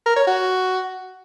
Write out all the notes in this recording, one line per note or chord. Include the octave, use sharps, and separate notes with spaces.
A#4
C#5
F#4